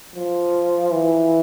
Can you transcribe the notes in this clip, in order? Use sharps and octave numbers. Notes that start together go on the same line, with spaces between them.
F3
E3